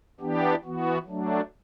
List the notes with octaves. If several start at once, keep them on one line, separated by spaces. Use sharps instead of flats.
E3 B3 D4 G4
E3 B3 F#4
F#3 A3 D4